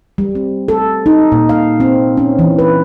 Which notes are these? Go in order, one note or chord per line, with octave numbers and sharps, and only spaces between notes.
G3
C4
A4
D#4
A#2
F5
C4
C#4
E3
B4